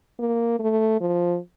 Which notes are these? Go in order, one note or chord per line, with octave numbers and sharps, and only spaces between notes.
A#3
A3
F3